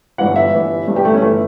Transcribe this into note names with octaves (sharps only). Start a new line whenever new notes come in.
G1 G2 E3 F#5
E5
G1 G2 E3
G1 G2 E3
G4
A3
C#4
G1 E3 A3